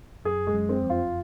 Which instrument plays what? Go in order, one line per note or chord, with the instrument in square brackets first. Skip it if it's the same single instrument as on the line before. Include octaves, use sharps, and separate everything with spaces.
[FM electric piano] F#2 [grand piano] G#4
[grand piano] G#3
[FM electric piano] F#2
[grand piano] C4
[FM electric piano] F2
[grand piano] F4